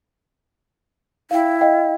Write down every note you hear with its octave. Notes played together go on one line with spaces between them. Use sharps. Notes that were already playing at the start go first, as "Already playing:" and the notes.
E4 F5 G5
D#5 F5 G5